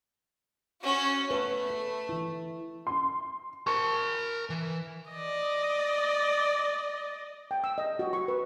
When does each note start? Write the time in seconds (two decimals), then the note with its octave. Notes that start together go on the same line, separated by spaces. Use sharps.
0.81 C#4 F#4
1.31 A3 B4
1.70 A4
2.09 E3 E4
2.87 C6
3.67 A#4 A5 C#6
4.50 E3
5.11 D5 D#5
7.51 G5
7.64 E6
7.78 D#5
7.99 F#4
8.13 C#6
8.28 B4